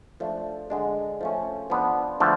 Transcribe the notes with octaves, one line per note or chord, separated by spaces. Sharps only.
F3 A3 D4
D3 G#3 D4
F3 A3 C#4
F3 B3 D4
D3 F3 A3